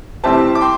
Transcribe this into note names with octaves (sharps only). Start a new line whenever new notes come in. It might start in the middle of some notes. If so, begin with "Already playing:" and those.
A2 G3 C4 G4 C5 E5 A5
D6
G5 C6